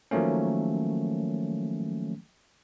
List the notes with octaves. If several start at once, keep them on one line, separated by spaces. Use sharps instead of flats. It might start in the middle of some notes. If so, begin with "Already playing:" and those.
D#3 F3 F#3 A3 A#3 C#4